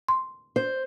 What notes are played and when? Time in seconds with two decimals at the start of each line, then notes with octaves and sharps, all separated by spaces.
0.09 C6
0.56 C5